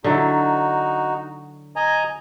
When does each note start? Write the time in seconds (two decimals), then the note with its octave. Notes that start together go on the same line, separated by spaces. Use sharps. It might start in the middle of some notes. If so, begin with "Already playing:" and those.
0.04 D3 F#3 D#4 E4 F#4
1.76 D#5 G#5 A#5